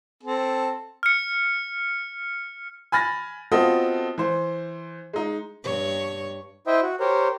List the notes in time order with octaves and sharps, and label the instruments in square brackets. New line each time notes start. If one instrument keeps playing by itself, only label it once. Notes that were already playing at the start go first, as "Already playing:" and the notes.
[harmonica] C4 A4
[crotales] F6 C#7
[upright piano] G#5 B5 F6 A6 A#6
B3 C4 F4 F#4 A4 D#5
E3 C5
G#3 D#4
[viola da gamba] G2 C#5
[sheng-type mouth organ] E4 C5 D#5 E5 G5
F#4
G4 A#4 C5 C#5